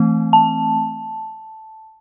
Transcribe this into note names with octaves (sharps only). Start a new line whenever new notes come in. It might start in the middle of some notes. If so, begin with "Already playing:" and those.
Already playing: E3 A3 C4
A5